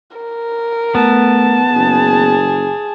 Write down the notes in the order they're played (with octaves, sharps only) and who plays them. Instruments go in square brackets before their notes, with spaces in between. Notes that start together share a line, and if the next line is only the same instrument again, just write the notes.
[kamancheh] A#4
[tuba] A3 [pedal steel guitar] B3 [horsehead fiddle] A5
[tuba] F#1 [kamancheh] G#4